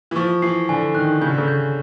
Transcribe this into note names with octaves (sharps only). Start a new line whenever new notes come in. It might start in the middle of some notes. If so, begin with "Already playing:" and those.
E3
F3 C#6
E3 C7
D3 G#5
D#3 F#6
C#3 G6
D3
C#3
G6